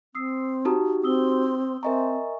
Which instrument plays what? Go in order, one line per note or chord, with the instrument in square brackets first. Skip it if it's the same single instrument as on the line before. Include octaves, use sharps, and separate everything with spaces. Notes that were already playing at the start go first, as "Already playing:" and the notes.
[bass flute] C4 [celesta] D#6 E6 C7
[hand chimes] D#4 F#4 G4 [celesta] A5 A#5 D#6
[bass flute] C4 [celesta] D#6 E6 G7
[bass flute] C4 [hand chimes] A#4 D#5 A#5 [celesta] E5 G#5 C#6